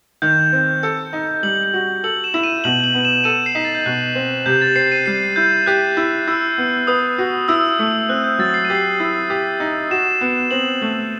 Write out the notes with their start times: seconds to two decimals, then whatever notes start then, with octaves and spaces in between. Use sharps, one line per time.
0.22 D#3 G6
0.53 C4
0.83 A4
1.13 D#4
1.43 G3 F#7
1.63 F#7
1.74 F#4
2.04 A4 F#7
2.24 E7
2.34 E4
2.43 D#7
2.64 B2 F#7
2.84 F#7
2.94 B3
3.05 E7
3.24 A4 D#7
3.46 C7
3.55 D#4 B6
3.65 A6
3.75 G6
3.86 B2 F#6
4.15 C4
4.46 C3 G6
4.62 A6
4.75 C4 C7
4.92 D#7
5.06 G3 C7
5.36 E4 G6
5.66 G4 F#6
5.97 E4
6.27 E4 E6
6.58 B3
6.87 B4 D#6
7.18 F#4
7.48 E4 E6
7.79 A3
8.09 C4 F#6
8.24 G6
8.39 F#3 A6
8.54 C7
8.65 D#7
8.70 G4
8.75 C7
9.00 E4
9.30 G4
9.60 D#4
9.91 F#4 E7
10.21 B3 E7
10.51 C4 F#7
10.82 A3 E7